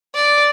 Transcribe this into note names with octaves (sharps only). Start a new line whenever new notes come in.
D5